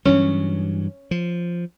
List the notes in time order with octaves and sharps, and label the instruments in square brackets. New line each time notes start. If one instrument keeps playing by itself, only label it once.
[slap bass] G2 E3 F#3 [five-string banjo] C#4
[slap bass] F3